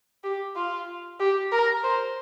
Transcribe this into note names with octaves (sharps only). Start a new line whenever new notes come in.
G4
F4
G4
A#4
C5